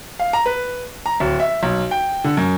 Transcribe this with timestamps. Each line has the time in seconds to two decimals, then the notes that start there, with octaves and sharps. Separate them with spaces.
0.19 F5
0.33 A#5
0.46 B4
1.06 A#5
1.20 D1
1.40 E5
1.63 B1
1.91 G5
2.24 D3
2.37 F#2